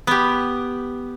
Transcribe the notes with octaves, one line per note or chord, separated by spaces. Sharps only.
B3 G4